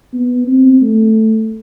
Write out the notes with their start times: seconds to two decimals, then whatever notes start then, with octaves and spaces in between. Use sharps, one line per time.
0.14 B3
0.47 C4
0.81 A3